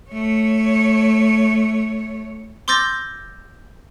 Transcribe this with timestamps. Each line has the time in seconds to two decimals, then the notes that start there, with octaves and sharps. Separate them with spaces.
0.11 A3 C#5
2.68 C6 D6 E6 G6 A6 A#6